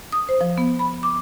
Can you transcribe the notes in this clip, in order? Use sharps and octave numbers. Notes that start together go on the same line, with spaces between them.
D#6
C5
F3
B3
B5
D6